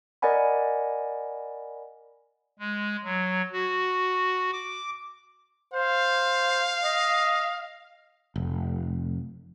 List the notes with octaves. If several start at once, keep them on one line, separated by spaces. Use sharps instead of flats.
A#4 D5 D#5 F#5 G#5 B5
G#3
F#3
F#4
D6
C5 F5
D#5
F1